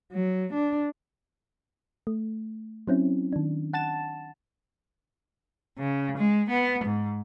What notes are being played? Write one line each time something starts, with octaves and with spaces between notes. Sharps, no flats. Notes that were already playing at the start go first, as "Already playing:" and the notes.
F#3
D4
A3
F#3 C4 C#4 E4
D#3 D4
F#5 A5 A6 E7
C#3
G#3
B3
G#2